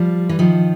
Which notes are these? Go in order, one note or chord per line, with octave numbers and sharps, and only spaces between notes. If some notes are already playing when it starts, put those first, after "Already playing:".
Already playing: F3 G3
E3
D#3 F3